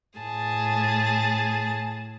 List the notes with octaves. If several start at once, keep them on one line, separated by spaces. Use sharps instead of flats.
A2 G#4 A5